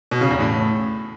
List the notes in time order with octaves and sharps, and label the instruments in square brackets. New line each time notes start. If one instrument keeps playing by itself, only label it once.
[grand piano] B2
C#3
E2
A2